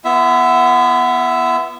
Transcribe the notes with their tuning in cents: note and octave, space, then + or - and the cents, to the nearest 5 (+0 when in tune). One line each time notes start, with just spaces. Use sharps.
B3 -5 E4 +45 E5 +0